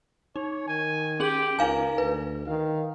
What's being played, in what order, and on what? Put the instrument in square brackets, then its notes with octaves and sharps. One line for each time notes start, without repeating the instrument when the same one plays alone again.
[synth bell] D#4 [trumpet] C#5
[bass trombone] D#3 [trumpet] G#5
[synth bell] C#4 G#4 F#7 [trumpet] G4
[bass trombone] C#2 [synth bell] D#4 F5 G#5 [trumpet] A#4
[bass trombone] D2 [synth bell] B4
[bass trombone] D#3 [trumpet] F5